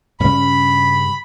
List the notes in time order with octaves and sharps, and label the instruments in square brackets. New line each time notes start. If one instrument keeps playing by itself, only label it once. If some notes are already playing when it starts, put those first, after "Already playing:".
[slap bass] G2 C#3 C#4 [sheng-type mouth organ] B5